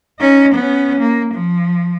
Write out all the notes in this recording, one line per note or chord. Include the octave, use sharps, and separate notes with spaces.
C#4 D#4
B3 C#4
A#3
F3